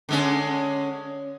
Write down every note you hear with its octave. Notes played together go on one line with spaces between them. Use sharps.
D3 G#3 C#4